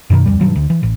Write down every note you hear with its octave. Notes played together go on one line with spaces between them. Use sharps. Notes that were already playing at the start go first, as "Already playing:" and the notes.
F#2 B2 D3 D#3
D1 F2 G3
G2 B2 D#3 F#3
D2
E3
A1